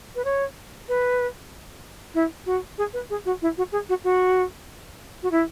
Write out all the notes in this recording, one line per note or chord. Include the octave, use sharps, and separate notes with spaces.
B4
C#5
B4
E4
F#4
G#4
B4
G#4
F#4
E4
F#4
G#4
F#4
F#4
F#4
E4